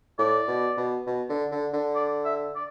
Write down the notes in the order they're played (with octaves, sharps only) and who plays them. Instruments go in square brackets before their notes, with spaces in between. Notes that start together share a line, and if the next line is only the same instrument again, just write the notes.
[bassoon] A2 [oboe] D5
[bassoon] B2
B2
B2
D3
D3
D3
[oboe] D5
E5
D5